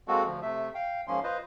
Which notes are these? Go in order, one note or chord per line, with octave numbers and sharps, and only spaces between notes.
G#3 A#3 C4 F#4 A4
D2 F3
C3 A3 E5
F5 G5
G#2 F3 A#3 C#4 C6
F4 B4 C5 D#5